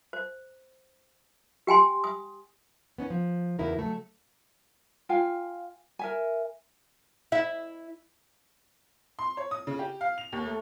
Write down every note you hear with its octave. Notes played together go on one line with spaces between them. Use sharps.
C5
G4 G5 G#5 C6
D#6
B3 C#4 D#4
F3
E2 C#3 D#4 E4 F#4 A#4
C#3 F#3 A3
F4 F5 G5 G#5
A#4 E5 G#5
E4 E5
C6
C#5
D#6
C#3
G4
F5
F7
D#2
A3